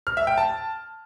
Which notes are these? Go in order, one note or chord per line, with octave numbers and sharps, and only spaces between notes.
F6
E5
G5
A5